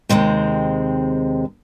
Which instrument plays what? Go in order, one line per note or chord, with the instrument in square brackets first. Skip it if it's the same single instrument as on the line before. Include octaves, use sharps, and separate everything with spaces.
[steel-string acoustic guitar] D#2 C3 G#3 C4